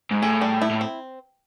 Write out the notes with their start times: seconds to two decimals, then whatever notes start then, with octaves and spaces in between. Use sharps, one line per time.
0.11 G#2
0.22 A2 G#4
0.41 G3
0.62 E4
0.70 A2
0.81 C4